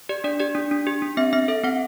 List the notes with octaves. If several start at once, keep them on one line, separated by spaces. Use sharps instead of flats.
G4 D5
D4 D5
G4 D5
D4
D4
G4
D4
C4 E5
C4 E5
A4 E5
C4 F#5